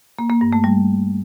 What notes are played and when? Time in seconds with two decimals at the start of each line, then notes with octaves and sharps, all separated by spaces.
0.19 A#3
0.30 A#3
0.41 G2
0.53 A3
0.64 G3